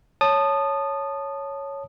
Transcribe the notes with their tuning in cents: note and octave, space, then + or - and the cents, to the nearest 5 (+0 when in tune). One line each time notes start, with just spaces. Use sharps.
C#5 +0 A5 +0 D#6 -20